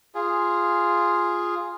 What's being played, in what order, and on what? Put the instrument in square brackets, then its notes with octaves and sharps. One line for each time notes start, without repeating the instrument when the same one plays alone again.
[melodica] F4 G#4